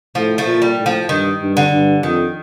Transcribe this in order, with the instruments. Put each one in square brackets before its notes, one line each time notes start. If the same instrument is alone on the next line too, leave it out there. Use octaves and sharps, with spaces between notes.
[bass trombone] A2 [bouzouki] F3
[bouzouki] F3 A3
[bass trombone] A#2
[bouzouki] G3
[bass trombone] A2
[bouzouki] F3
[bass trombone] G2 [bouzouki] D#3
[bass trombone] G2
[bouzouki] D3
[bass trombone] G2
[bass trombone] F2 [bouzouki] D#3